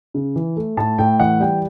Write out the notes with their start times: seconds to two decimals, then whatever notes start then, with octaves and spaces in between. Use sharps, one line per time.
0.14 C#3
0.36 E3
0.57 A3
0.77 A2 A5
0.98 A2 G5
1.20 E3 F#5
1.40 G3 G5